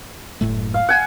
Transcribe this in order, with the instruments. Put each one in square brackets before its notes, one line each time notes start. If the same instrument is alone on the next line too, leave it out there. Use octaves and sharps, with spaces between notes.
[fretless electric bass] F#1 A2 A3
[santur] F5
F#5 G#5